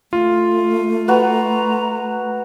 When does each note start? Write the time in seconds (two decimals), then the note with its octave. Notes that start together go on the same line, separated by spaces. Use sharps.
0.13 A3 F4
1.08 F#4 B4 A#5